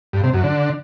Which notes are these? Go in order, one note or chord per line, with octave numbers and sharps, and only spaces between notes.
G2
C3
F#2
D3